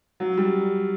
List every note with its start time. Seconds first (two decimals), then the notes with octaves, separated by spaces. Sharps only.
0.20 F#3
0.37 G3